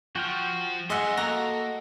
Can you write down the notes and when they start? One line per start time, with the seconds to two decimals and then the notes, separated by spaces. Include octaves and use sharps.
0.16 F3 F#4 G5 F6
0.90 F#2 G#4 D#5 E5 F#5 C6
1.17 A#3 F#4 A4 A#5